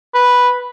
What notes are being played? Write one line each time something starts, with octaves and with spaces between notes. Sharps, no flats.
B4